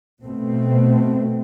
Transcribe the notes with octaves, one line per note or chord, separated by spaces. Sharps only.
B2 A3 C4